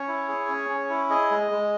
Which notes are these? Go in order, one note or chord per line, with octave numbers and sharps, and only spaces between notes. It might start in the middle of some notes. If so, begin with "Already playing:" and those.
Already playing: C#4 C#5
E4
G#4
C#4
C#4
E4
G#4 D#5
G#3
G#3